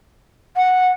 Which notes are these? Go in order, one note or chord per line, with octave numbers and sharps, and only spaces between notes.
F#5